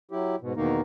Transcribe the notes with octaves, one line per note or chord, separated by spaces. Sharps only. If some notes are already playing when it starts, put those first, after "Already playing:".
F#3 E4 G4
G#2 B2
E2 B2 D#3 A#3 D#4